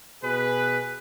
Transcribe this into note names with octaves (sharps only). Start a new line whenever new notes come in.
B2 G#4 B4